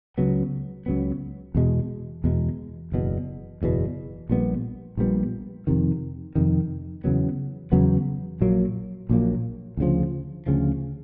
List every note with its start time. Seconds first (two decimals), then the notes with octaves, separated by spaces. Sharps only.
0.18 C#2 C#3 F#3 B3
0.86 C#2 C#3 F#3 B3
1.55 E2 B2 G#3
2.24 E2 B2 G#3
2.92 F#1 E2 B2
3.61 F#1 E2 B2
4.29 A#1 A#2 G3 B3
4.97 A#1 A#2 G3 B3
5.67 F2 C3 D#3
6.35 F2 C3 D#3
7.04 E2 C#3 F#3 B3
7.72 E2 C#3 F#3 B3
8.41 A#1 A#2 F#3 A#3
9.09 A#1 A#2 F#3 A#3
9.77 D2 C#3 F3
10.46 D2 C#3 F3